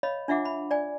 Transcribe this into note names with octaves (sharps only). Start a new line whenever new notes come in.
C#5 D#5 F5 B5
D4 F4 E5 F#5 D6
B5
D5 G#5